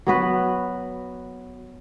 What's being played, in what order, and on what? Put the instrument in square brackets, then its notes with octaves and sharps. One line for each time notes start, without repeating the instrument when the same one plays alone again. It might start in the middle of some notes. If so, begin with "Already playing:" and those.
[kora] F#3 B3 F#4 B4